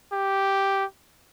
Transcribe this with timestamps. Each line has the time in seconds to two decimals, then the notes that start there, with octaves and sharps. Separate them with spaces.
0.12 G4